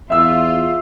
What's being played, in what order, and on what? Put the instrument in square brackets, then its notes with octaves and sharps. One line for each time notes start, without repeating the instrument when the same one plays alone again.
[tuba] E2 [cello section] F4 [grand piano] E5 E6